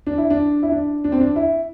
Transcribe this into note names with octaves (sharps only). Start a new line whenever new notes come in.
D4
E4
D4
E4
D4
D4
C4
D4
E4